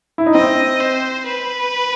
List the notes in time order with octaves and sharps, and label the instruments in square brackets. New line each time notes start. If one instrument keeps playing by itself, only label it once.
[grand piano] E4
D#4
[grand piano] C4 [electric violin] D#5
[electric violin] C5
B4